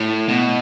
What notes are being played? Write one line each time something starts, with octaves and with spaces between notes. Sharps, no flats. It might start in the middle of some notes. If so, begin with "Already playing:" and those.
Already playing: A2
B2